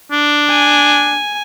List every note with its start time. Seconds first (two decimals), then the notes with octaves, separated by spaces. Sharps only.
0.12 D4
0.50 G#5